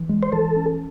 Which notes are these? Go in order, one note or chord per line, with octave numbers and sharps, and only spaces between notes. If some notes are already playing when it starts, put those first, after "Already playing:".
Already playing: E3
G#3
C5
E3 A4
C#4